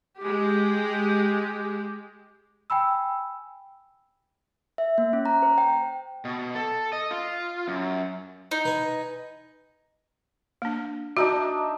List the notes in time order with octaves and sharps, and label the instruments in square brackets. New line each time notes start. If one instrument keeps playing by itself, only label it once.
[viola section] G#3 G4
[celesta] G5 G#5 B5 E6
[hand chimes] E5
A#3
C#4
A#5
C5
G5
[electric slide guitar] B2
A4
D#5
F4
F#2
[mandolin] D#4
[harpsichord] B4 G#5
[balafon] A#3 D4
[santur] D4 D#4 E5 [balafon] F#4